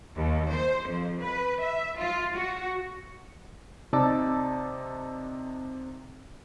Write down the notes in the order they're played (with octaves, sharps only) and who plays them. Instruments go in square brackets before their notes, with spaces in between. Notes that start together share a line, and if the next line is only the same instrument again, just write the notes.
[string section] D#2
C5
F2
B4
E5
F4
F#4
[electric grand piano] C3 D#4 D5 A5 D6 E6